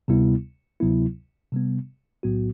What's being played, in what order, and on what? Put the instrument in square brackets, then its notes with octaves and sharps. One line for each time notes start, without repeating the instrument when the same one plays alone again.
[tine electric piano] D2 C3 G3 B3 E4
D2 C3 F#3 B3 E4
C3 G3 B3
B1 A2 F#3 B3 F#4